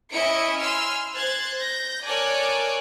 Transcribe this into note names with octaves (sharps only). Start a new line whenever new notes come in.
C#4 E4 D#5 E5 C#7 D7
G#5 C6 E6 F6
C5 F#6 G#6 A6
G6 A#6
A4 A#4 C#5 D5 G#5 F#6